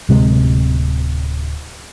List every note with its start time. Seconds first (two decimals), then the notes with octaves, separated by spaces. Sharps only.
0.09 D1 C3 G#3